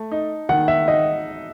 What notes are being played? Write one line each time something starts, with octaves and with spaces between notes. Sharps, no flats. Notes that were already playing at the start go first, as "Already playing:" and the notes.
Already playing: A3 A5
D#4
D#3 F#5
E5
D#4 D#5